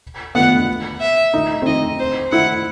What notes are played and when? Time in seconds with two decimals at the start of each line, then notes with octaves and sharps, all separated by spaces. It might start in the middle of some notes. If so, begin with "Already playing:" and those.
0.35 B3 F#5
1.01 E5
1.34 D#4
1.62 C4
1.66 D#4 D#5
1.99 C5
2.32 E4 F#5